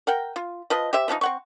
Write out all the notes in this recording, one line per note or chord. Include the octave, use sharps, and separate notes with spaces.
A#4 F#5 G5
F4
F3 B4 D#5
G4 C5 E5
E3 F3 D4 D#4
C4 F#5 C#6